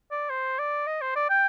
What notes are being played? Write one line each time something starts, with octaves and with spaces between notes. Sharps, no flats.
D5
C5
D5
D#5
C5
D5
G5